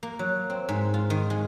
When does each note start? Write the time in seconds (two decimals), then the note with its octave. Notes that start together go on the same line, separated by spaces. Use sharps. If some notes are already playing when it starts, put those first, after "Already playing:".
0.03 A#3
0.19 F#3
0.50 C4
0.69 G#2
0.94 F4
1.10 D#3
1.30 G#3